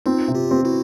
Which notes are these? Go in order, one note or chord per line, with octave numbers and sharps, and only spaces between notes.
C4 D#4 F4
C3
F4 G4
C4
E4 F#4